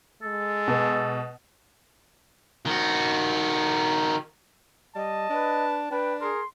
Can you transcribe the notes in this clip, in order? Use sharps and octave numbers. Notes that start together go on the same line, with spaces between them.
G#3 A4
B2
D#3 F#4
G3 D#5 A5
D4 B4
D4 B4 G5
G#4 A#4 C6